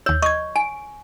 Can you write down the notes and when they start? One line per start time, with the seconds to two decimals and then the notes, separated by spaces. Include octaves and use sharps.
0.06 D#2 C#5 E6
0.22 D#5 C#6 G#6
0.56 G#5 D7